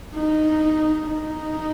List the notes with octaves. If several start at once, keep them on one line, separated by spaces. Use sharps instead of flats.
D#4
D#4